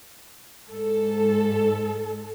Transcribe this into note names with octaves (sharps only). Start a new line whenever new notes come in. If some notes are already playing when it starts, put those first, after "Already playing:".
G#2 A4